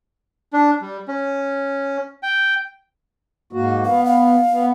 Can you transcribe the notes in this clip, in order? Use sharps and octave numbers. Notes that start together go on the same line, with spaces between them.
D4
G3
C#4
G5
G#2 A#3 F#4
B3 F5
F5
B3